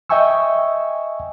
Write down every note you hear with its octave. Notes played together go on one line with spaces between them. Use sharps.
D#5 E5 G5 G#5 C#6 E6